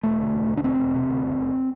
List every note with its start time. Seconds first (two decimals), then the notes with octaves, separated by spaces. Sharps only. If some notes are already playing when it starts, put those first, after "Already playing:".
0.03 E1 A3
0.19 D2
0.34 E1
0.48 D2
0.57 D4
0.64 E1 C4
0.79 E1
0.94 C3
1.10 D2
1.24 F#1
1.38 F#1